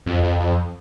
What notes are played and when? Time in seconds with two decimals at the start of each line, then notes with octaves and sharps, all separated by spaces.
0.06 F2
0.23 F2
0.40 F2